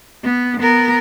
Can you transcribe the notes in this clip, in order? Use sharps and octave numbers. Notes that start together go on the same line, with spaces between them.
B3
B3 A#4